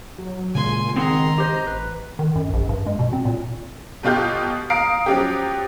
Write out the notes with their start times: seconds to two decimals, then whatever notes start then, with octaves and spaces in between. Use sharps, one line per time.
0.18 F#3
0.55 A#2 C#3 G#3 G#5 C6
0.96 D#3 C4 G#4 F#5 A#5 C6
1.38 G4 C5 D#5
1.67 A1 B4
2.19 D#3
2.36 F#2
2.53 A#1
2.69 G2
2.86 G#3
2.99 B2
3.13 C4
3.25 A#2
4.03 G1 B2 F4 G4 G6
4.70 F5 A#5 D#6 C7 D7
5.06 F3 F#3 C#4 G4